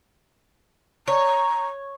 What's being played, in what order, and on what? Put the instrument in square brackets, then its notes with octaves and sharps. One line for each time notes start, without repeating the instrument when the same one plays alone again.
[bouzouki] C#5 [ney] A#5